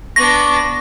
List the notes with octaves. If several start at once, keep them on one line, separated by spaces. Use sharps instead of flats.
B3 D4 C#6 D6 A#6